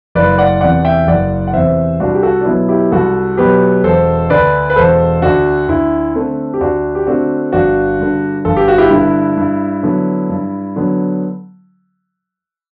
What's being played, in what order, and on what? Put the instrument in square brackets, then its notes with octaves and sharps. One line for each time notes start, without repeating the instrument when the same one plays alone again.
[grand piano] F#1 B4 D5
D5 F#5
E2 C3 D5 F#5
E5 G5
F#1 D5 F#5
F#5
E2 C3 C5 E5
C2 D4 F#4
G4
F#4 A4
D4
B2 F#3 B3 E4
E4 G4
C2 F#4 A4
B2 F#3 B3 G4 B4
E1 A4 C5
D2 D3 B4 D5
B4
E1 A4 C5
D2 D3 D4 F#4
D2 E4
D3 A3 C4
G4
D2 D4 F#4
G4
D3 A3 C4 D4 F#4
G1 D4 F#4
G2 D3
G1 A4
G4
F#4
E4 G4
G2 D3 E4
G2
D3 F#3 B3
G2
D3 F#3 B3